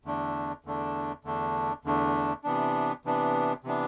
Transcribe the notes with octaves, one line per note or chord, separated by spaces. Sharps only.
E2 D3 A3 D4
E2 D3 A3 D4
E2 D3 A3 D4
E2 D3 A3 D4
C3 E3 B3 D4
C3 E3 B3 D4
C3 E3 B3 D4